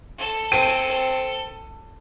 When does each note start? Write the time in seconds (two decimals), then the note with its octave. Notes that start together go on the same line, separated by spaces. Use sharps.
0.18 A4
0.52 C4 D#7